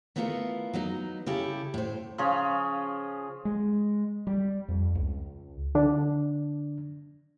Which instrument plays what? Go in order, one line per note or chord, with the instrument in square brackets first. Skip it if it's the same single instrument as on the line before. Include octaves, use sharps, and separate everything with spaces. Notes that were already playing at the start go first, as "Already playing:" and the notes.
[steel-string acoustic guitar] A3 B3 E4 F4 A4 A#4
F#3 B3 D#4
C#3 E4 G4 A4
A2 C5
[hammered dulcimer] C#3 F3 G#4 C#5
[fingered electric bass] G#3
G3
F2
C#2
[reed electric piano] D3 D4